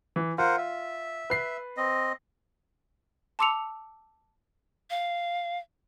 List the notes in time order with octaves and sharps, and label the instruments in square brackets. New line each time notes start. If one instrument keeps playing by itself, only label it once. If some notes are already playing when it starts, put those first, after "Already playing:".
[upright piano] E3
[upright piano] F4 [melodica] A#4 C5 F#5
[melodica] E5
[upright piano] B4 C7
[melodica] C4 D#5
[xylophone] A5 C6 D6 E6 C#7 F7
[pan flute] F5